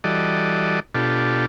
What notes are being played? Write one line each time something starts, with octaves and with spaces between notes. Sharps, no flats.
E3 G3 F#4 A4 D5 D#5
B2 D4 F4 G4 A4